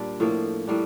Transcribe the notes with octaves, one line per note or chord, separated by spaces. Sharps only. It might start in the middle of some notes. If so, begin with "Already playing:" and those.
Already playing: A#2 G3 D4
A2 F3 A#3
A2 G3 A#3 D4